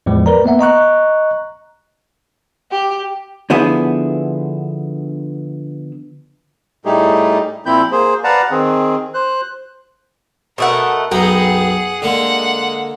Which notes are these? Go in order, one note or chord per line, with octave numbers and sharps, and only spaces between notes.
E2 A2 F3 G#3
A#4 B4 D5 A#5
A#3 B3 E5 F#5
D#5 A#5 C#6 F#6
G4
D3 F3 B3 E4 G#4
A2 G3 A3 D#4 G4 G#4
A#2 F3 C4 E4 B5 G6
A#3 G#4 C5
B4 D5 F5 F#5 A5 A#5
D#3 C4 G#4
C5 F#6
B2 A3 A#4 F#5
B1 F#2 B3 G#4 F#5 G5 A#5
D3 G#3 A#3 F#5